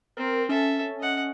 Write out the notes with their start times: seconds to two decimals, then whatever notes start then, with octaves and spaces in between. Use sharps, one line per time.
0.17 C4 A#4
0.49 C#4 A4 E5
1.00 D#5 F#5